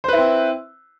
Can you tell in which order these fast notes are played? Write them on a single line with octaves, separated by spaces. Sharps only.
C5 B4 E4 C4